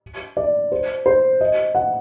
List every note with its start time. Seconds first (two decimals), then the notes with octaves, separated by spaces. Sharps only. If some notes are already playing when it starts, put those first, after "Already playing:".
0.37 D5
0.72 C5
1.06 C5
1.41 D#5
1.75 F#5